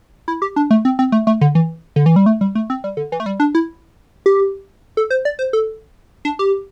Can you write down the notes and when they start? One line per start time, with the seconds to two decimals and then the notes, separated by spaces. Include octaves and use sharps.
0.28 E4
0.42 G4
0.56 D4
0.71 A3
0.85 C4
0.99 C4
1.12 A3
1.27 A3
1.41 D3
1.55 E3
1.96 D3
2.06 E3
2.16 G3
2.26 A3
2.41 G3
2.55 A3
2.70 C4
2.84 G3
2.97 D3
3.12 E3
3.20 A3
3.26 G3
3.40 D4
3.55 E4
4.26 G4
4.97 A4
5.10 C5
5.25 D5
5.39 C5
5.53 A4
6.25 D4
6.39 G4